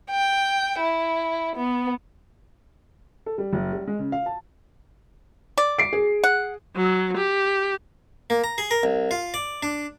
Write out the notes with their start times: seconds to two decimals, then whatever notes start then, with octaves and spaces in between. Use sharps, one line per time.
0.10 G5
0.80 E4
1.55 B3
3.26 A4
3.38 G3
3.53 F#1
3.72 G3
3.87 G#3
3.99 C#3
4.12 F5
4.26 A5
5.58 D5
5.79 C7 D7
5.93 G#4
6.24 F#5
6.76 F#3
7.17 G4
8.30 A#3
8.44 A#5
8.58 G#4
8.71 A#4
8.83 C2
9.11 F4
9.34 D5
9.63 D4